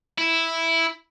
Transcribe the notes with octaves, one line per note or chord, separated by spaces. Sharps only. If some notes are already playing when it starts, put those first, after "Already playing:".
E4